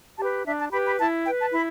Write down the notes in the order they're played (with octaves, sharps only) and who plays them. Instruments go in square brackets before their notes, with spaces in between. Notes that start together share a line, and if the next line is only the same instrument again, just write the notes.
[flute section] G4 B4 A5
D4 E5
A5
G4 B4 B5
B5
E4 A5
B4 G5
A5
E4 B5